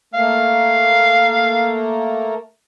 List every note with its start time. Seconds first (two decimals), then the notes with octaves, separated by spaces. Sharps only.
0.14 A3 A#3 F5